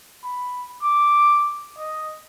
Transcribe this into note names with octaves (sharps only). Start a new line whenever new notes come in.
B5
D6
D#5